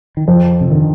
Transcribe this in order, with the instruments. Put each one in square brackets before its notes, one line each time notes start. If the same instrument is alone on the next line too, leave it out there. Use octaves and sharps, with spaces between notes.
[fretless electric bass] D#3
[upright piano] F2 [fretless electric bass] F3
[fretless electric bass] C3
[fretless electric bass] D3 [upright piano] D#3